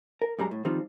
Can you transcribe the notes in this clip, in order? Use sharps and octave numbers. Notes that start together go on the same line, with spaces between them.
A#4
F#2 G3 G#3 A#5
A2
D#3 F3 G3 C4 D#4 F4